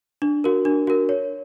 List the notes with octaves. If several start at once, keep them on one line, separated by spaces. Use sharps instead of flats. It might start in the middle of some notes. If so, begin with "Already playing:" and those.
D4
F#4 A#4
D4
F#4 A#4
C#5